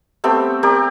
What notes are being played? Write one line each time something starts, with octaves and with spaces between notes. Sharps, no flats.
A3 B3 C4 G4
G4 A#4 D5